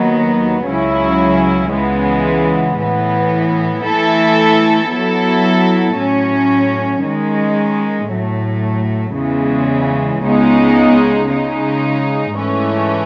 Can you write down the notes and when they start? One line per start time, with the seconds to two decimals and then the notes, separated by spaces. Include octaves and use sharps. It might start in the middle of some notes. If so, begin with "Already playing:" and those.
Already playing: D#2 D#3 F#3 B3
0.66 C#2 C#3 F#3 C#4 E4
1.72 C#2 C#3 E3 G#3 B3
2.79 A2 E3 B3
3.85 E3 A3 E4 A4 E5
4.92 F#3 B3 E4 A4
5.98 A2 F#3 C#4
7.04 D#3 G#3 C#4
8.11 A2 F#3 A3
9.17 E2 C#3 E3 G#3
10.23 C#2 C#3 G#3 B3 D#4
11.29 C#3 G#3 D#4
12.36 G#2 E3 A3 C#4